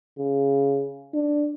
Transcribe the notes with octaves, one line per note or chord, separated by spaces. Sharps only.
C#3
D4